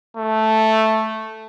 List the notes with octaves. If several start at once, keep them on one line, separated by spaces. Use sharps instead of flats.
A3